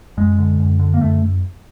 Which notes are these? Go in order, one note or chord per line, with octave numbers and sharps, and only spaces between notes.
F#2 G#3
D3
F#2
D3
A#3
F#2 A3